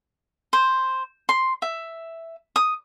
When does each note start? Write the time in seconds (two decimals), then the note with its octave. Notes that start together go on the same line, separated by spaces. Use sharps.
0.53 C5
1.29 C6
1.62 E5
2.56 D#6